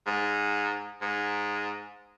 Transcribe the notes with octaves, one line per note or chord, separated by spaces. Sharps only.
G#2
G#2